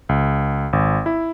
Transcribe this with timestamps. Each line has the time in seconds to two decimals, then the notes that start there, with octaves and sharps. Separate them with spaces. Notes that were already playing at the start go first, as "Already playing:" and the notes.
0.09 C#2
0.73 G#1
1.06 E4